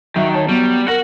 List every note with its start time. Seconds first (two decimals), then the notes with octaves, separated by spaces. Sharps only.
0.16 D#3 F#3 E5
0.34 C#5 A5
0.49 F#3 G3 B3
0.88 F#4 A#4 F#5 A#6